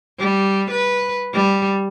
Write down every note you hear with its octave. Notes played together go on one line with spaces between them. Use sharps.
G3
B4
G3